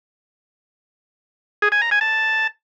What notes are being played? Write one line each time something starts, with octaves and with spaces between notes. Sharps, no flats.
G#4
G#5
A#5
G#5
A5